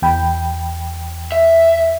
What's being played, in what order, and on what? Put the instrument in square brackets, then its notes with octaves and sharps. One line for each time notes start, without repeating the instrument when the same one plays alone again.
[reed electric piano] E2 G5 B5
[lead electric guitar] E5